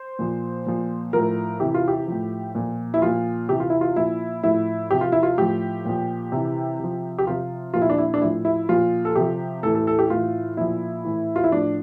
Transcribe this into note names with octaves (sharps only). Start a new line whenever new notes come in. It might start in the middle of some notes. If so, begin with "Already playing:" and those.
Already playing: C5
A#2 F3
A#2 F3
A2 F3 A#4
C3 E3 G4
F4
G4
A2 F3
A#2 F3
E4
A#2 F3 F4
C3 E3 G4
F4
E4
F4
A#2 F3 E4
A2 F3 E4
C3 F3 G4
F4
E4
F4
A2 F3 G4
A#2 F3
C3 E3
C3 F3
G4
C3 F3 F4
A#2 F3 F4
E4
D4
E4
D4
A2 F3 E4
E4
A#2 F3 F4
A4
C3 F3 G4
A2 E3 A4
A4
A4
G4
A2 E3 F4
A#2 F3 E4
A2 E3
F4
E4
A2 F3 D4